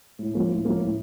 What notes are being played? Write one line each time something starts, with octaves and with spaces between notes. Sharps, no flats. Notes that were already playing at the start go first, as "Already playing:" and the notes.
A2
F3 A#3 C#4
A2
F3 A#3 C#4
A2